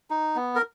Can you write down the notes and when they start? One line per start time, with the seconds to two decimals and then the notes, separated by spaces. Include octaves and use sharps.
0.10 D#4
0.36 B3
0.56 A#4